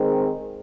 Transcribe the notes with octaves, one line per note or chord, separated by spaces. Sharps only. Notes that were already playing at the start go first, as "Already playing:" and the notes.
Already playing: D#3 G#3 C4